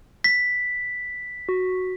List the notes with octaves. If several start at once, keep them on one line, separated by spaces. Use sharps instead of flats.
B6
F#4